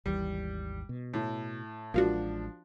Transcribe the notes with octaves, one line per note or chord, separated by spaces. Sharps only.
G#1 D#2 E3 G3
B2
A2
A1 F3 G#3 A#3 D4 F4 F#4